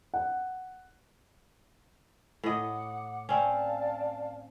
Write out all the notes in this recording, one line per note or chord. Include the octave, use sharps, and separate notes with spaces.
F#5
A2 D#5 F#5 D6
C4 C#4 D5 F5 A5